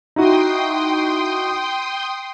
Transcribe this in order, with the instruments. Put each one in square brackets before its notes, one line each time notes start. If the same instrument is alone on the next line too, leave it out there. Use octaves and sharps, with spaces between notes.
[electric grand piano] D#4 E4 F#4 [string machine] G5 C6 D#6